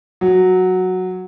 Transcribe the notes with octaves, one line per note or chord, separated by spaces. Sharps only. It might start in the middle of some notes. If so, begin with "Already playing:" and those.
F#3